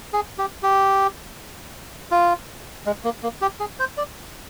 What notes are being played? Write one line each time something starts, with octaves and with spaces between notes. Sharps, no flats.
G#4
G4
G4
F4
G#3
A#3
A#3
G4
G#4
C5
D5